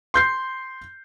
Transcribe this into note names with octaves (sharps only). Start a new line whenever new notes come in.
C6 G6 C7